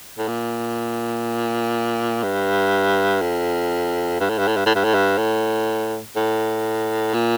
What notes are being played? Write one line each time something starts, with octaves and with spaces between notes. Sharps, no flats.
A2
A#2
G2
F2
G2
A2
G2
A2
G2
A2
G2
A2
G2
A2
A2
A#2